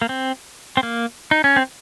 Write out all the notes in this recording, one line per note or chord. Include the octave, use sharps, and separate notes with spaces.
A#3
C4
C4
A#3
D#4
C#4
C4